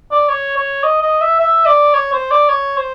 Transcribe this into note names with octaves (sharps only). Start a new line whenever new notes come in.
D5
C#5
C#5
D#5
D#5
E5
E5
D5
C#5
C5
D5
C#5
C5